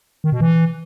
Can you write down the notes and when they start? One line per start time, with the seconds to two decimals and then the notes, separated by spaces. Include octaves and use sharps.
0.24 D#3
0.32 B2
0.41 E3